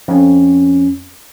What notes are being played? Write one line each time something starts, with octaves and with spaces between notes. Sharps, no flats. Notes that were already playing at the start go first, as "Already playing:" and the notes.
F2 C#4